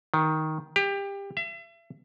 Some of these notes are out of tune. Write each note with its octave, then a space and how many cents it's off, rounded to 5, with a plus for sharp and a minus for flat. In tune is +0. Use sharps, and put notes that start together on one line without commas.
D#3 +10
G4 +25
E5 +35